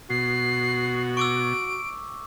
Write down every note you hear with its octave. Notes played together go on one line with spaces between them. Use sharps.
B2 F#4 C7
C#6 D6 E6 D7